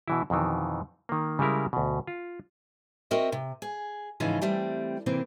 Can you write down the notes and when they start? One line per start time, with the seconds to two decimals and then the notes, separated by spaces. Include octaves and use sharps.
0.08 B2 E3 E4
0.30 F2 B2 D#3 E3
1.09 D#3 A#3
1.39 C#3 G3 G#3 E4 A#4
1.73 D2 B2
2.07 F4
3.11 C4 F#4 A#4 D#5 E5
3.32 C3
3.62 G#4
4.20 G#2 C#3 E3 F3 C#4 F4
4.42 E3 G3 A3 C4
5.06 C3 E3 A#3 C4